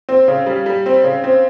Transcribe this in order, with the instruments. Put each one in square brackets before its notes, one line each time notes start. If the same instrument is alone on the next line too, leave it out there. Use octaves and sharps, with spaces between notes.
[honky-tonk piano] C4
C#3
G3
G3
C4
C#3
C4